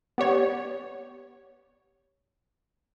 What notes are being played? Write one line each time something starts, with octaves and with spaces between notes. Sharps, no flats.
B3 G4 C#5 D5